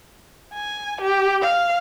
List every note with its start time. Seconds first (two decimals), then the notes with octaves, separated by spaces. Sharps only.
0.54 G#5
1.01 G4
1.42 F5